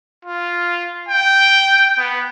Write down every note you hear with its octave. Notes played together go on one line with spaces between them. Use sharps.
F4
G5
B3